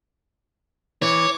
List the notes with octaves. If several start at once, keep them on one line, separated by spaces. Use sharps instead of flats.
E3 C#5 D6